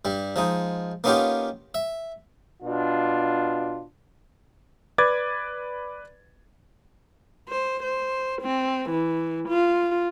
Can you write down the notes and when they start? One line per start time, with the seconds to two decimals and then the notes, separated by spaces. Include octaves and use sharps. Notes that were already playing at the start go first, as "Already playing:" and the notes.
0.05 G2 G3
0.36 F3 G#3 D#4
1.04 A#3 B3 C#4 D#4 F4 G4
1.74 E5
2.63 B2 D4 F4
4.98 B4 D5 D6 G#6 A6
7.49 C5
7.83 C5
8.42 C4
8.90 E3
9.49 F4